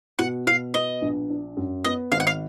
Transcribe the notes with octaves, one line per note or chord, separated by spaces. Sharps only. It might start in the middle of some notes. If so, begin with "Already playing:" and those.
B2 F#5
B2 F5
B3 D#5
A#1
D4
F#2
B3 D#5
G#1 F5
F#5
F5